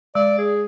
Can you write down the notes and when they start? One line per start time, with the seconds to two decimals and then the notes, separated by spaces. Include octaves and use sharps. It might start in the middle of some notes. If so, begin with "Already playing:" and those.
0.15 G#3 D5
0.38 G#4